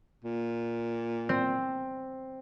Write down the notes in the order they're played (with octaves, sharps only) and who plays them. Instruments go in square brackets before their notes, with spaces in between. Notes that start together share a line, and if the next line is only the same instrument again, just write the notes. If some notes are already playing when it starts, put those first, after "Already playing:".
[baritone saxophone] A#2
[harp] C4